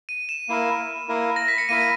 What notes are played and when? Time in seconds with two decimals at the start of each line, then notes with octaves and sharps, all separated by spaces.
0.09 D#7
0.29 E7
0.49 A#3 E4 A#4
1.09 A#3 E4 A#4
1.36 A#6
1.48 B6
1.58 C#7
1.69 A#3 E4 A#4 D#7